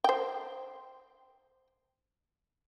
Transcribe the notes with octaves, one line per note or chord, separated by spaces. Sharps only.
C5 G5